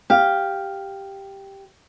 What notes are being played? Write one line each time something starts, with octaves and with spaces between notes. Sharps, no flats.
G4 F5